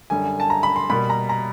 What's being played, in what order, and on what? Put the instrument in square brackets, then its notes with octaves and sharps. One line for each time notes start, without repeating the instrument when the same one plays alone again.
[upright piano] F#2 D3 G3 G#5
A5
A#5
B5
C6
B2 G3 A#3 B5
A#5
A#5